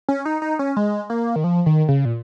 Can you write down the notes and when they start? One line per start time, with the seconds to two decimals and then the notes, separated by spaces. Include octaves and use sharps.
0.09 C#4
0.25 D#4
0.42 D#4
0.59 C#4
0.76 G#3
1.10 A#3
1.36 D#3
1.44 F3
1.66 D#3
1.89 C#3
2.05 A#2